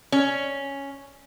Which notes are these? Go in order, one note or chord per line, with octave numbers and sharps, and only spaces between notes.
C#4